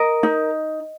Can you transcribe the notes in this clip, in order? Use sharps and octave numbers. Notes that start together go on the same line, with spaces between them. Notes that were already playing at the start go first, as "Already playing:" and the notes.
Already playing: A#4 D#5
D#4